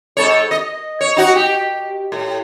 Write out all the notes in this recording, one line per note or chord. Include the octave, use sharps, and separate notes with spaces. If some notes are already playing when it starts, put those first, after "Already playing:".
G#2 A4 C#5
D#5
C#5
D#4 F#4
G4
A2